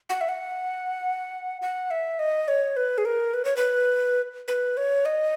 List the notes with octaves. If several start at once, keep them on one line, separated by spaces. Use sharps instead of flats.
F#5
E5
F#5
F#5
E5
D#5
C#5
B4
G#4
A#4
B4
C#5
B4
B4
C#5
D#5